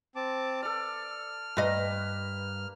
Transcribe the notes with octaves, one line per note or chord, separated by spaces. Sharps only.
C4 A5 D6
A4 D5 F6
G2 A#3 B4 D#5